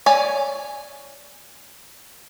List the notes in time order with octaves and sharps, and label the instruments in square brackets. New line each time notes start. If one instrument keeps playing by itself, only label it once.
[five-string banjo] C#5 D5 G#5